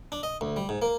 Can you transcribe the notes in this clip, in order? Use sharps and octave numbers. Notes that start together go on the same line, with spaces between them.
D4
D#5
D2
G3
G#2
A#3